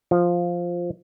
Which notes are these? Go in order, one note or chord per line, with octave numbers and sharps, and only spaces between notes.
F3